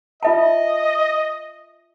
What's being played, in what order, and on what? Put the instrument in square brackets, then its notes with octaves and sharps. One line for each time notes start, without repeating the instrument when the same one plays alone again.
[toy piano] F4 E5 A5 [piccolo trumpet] D#5